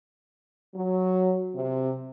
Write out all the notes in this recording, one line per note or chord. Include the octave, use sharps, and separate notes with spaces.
F#3
C3